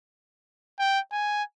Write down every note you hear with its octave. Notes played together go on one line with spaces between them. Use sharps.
G5
G#5